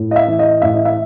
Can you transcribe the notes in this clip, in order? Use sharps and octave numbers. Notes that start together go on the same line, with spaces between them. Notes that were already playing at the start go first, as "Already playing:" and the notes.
Already playing: A2
D#5
E5
E3
D#5
A2 E5
D#5
E5